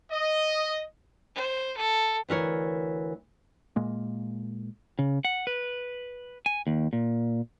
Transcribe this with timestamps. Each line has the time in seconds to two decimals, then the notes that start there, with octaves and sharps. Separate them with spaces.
0.13 D#5
1.35 C5
1.77 A4
2.29 D2 E3 A#4 C#5
3.76 A#2 G#3 A#3
4.99 C#3
5.25 F#5
5.47 B4
6.46 G#5
6.67 D#2
6.93 A#2